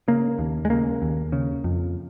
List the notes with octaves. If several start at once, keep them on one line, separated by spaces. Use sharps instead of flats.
C#3 A#3
D#2
G#3
C#3 A#3
D#2
C#3
F2